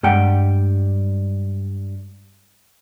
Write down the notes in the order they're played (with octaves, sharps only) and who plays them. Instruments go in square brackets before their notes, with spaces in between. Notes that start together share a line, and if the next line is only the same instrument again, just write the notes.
[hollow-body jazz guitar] G2 G3 G#3 G4 F#5 G5